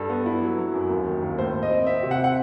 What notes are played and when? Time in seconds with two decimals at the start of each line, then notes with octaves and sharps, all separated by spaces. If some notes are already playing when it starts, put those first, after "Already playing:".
Already playing: G2 A4
0.09 B3
0.26 E4
0.41 F#3
0.58 F#3
0.74 F#2
0.90 D#2
1.06 D#3
1.23 D#2
1.38 A2 C5
1.55 A2
1.63 D#5
1.71 C4
1.86 C4 E5
2.03 C3
2.11 F#5
2.24 F#5